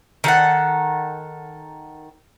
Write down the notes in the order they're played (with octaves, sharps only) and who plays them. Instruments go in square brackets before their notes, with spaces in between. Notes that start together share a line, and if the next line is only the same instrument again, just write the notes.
[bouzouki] D#3 A4 F#5